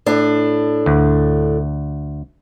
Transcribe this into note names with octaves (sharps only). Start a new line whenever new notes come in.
A2 D4
D2